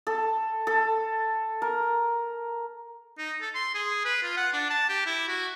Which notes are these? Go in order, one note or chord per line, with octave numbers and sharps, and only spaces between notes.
A4
A4
A#4
D#4
A4
C6
G#4
B4
F4
F#5
D4
A5
G4
E4
F#4